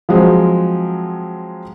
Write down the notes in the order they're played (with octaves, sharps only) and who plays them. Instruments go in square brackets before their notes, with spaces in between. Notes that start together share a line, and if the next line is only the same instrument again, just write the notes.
[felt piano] F3 F#3 G#3 C4